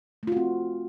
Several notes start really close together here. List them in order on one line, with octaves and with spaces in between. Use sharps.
A3 F4 F#4 C4